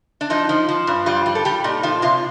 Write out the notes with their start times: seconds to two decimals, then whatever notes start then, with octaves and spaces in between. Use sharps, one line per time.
0.21 D4
0.30 F3 D#4
0.49 F3
0.69 F3
0.87 G2
1.06 G3 F4
1.26 G3
1.35 A4
1.45 G3 G4
1.64 A#2 D#4
1.83 F3 F4
2.02 C3 F4